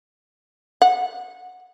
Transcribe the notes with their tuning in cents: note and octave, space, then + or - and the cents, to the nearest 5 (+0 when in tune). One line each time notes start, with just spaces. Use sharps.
F#5 -25